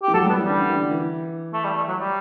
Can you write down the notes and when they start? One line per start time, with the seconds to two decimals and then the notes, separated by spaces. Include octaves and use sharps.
0.03 G4
0.08 E3
0.14 F#3 A4
0.26 G3 B3
0.38 E3
0.45 D3 G3
0.61 D3
0.69 E3
0.76 D3
0.91 E3
1.53 A3
1.64 G3
1.77 A3
1.88 F#3
2.00 G3